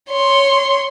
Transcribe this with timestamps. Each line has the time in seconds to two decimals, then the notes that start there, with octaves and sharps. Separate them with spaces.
0.10 C#5 C6